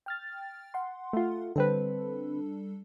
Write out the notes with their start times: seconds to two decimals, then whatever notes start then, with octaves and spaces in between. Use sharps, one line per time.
0.06 G5 F6 A6
0.74 F#5 C6
1.13 A3 F4
1.56 D3 G3 C4 D4 A4 B4